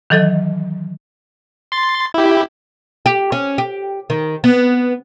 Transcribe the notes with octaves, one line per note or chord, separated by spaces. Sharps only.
D#3 E3 F#3 A4 D#5
C6 A6
E4 G4
G4
C#4
G4
D#3
B3